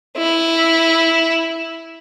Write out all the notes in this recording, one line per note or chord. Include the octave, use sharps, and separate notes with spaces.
E4